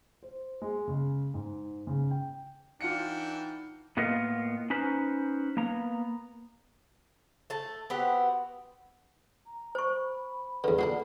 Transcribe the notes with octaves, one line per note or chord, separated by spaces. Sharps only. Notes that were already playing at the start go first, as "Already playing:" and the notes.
C5
G#3
C#3
G#2
C#3
G5
E3 D4 D#4 F4 F#5 G5 C#7
A2 A#3 B3 F4 A#4 D#5
C#4 D#4 B4 C5
A#3 B3 A#5
A3 A5
B3 C4 F#4 G4
A#5
C5 B5 C#6
E2 D3 B4
A#2 D3 D4 F#5